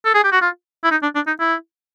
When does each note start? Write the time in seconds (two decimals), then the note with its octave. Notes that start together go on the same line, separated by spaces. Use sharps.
0.05 A4
0.14 G#4
0.24 G4
0.32 F#4
0.42 F4
0.84 E4
0.91 D#4
1.03 D4
1.15 D4
1.27 D#4
1.40 E4